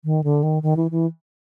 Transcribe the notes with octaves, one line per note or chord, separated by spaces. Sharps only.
D#3
D3
D#3
D#3
E3
E3